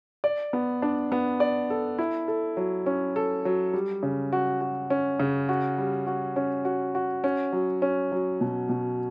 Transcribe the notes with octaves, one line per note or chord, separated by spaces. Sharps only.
D5
B3
D4
B3
D5
A4
E4
A4
F#3
C#4
A4
F#3
G3
C#3
F#4
F#4
C#4
C#3
F#4
G3
F#4
C#4
F#4
F#4
C#4
F#3
C#4
F#3
B2
B2